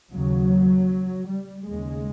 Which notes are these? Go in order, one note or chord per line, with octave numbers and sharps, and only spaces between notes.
D#2 C#3 F#3
G3
D#2 C#3 G#3